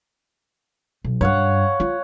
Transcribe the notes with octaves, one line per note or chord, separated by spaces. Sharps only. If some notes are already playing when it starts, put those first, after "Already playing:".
B1
G2 C#5 F5 F#5
F4